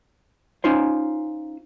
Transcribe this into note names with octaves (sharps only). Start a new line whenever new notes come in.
C#4 D#4 F4 C5